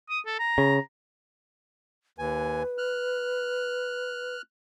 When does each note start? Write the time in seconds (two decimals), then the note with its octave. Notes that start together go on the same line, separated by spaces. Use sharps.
0.10 D#6
0.26 A4
0.39 A#5
0.58 C#3
2.19 D#2 B4 G#5
2.78 F6 F#6